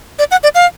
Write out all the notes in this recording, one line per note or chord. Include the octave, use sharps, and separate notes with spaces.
D5
F#5
D5
F5